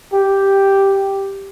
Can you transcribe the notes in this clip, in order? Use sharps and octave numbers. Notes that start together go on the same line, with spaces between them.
G4